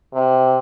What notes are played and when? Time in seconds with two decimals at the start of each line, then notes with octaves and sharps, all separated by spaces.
0.14 C3